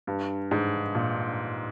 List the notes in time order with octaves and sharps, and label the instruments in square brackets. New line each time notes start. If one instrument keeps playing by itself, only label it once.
[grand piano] G2
G#2
A#2